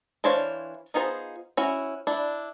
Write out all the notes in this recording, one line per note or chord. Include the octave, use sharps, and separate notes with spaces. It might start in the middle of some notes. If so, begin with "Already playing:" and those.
E3 D4 C5 C#5 F5
B3 D#4 F4 G#4 C5
C#4 E4 F#4
D4 E4